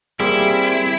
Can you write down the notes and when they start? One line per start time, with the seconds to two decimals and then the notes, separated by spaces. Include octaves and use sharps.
0.20 G3 A#3 C4 E4 G4 G#4